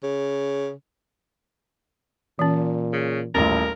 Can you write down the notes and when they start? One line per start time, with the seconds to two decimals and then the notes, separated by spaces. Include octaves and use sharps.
0.03 C#3
2.39 A#2 E3 C#4
2.93 C#3
3.35 D#1 A1 C#4 A#4